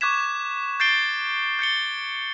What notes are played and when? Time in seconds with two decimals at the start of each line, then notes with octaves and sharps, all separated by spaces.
0.01 C#6 D6 F#6 G#6 B6 E7
0.80 G6 A6 C7 D7 G7
1.59 G6 A6 C#7 G7